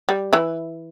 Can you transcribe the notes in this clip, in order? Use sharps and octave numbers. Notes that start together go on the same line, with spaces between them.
G3
E3 E4